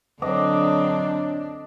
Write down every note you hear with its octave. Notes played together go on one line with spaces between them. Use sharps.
D3 F#3 C4 D4 D#5 D6